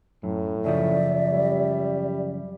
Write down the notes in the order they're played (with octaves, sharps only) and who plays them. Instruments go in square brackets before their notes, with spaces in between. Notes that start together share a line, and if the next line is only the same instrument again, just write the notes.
[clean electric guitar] F#2 [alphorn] A2
[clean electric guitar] F#2 C#3 F3 [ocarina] D5 [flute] E5
[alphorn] G3